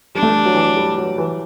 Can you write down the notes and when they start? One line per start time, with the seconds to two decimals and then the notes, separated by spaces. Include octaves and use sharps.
0.15 G3 D4
0.23 A3
0.30 G3
0.46 F#3
0.54 E3
0.63 F#3
0.77 G3
0.98 F#3
1.18 E3